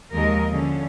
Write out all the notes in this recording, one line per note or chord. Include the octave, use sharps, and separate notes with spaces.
D#2 F3 G#3 A#4 D#5
D3 F3 C#4